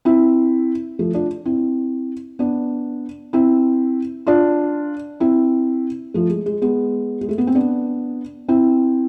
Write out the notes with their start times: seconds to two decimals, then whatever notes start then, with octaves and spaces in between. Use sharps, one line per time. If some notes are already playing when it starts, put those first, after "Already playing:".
0.05 C4 E4
0.99 F3 A3
1.14 D4 F4
1.45 C4 E4
2.39 B3 D4
3.33 C4 E4
4.27 D4 F4
5.20 C4 E4
6.14 F3 A3
6.30 G#3
6.46 G#3
6.62 G#3 B3
7.21 G#3
7.29 A3
7.38 B3
7.47 C4
7.55 B3 D4
8.48 C4 E4